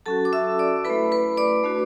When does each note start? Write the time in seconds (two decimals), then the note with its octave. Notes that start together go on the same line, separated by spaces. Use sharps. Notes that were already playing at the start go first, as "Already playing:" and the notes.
0.06 F#3 C#4 F#4 A4 A5
0.25 D6
0.33 E5 E6
0.59 D5 D6
0.85 E4 B4 B5
0.90 A3
1.12 B4 B5
1.37 D5 D6
1.64 A3 D4 F#4